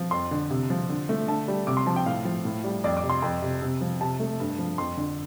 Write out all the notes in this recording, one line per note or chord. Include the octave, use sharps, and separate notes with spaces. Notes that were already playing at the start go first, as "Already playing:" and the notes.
Already playing: F3
F2 C6
D3
C3
F3
D3
A3
D3 A5
G3
C3 D6
C6
F3 A5
G5
A2 F5
F3
A2
G3
F2 D5
D6
C3
C6
F2
C3
C3
F3
C3 A5
A3
G2
F3
F2 C6
D3